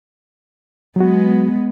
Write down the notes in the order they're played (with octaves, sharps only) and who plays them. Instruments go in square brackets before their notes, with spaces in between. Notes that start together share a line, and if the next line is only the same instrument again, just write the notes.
[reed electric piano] F#3 F#4 [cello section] G#3 B3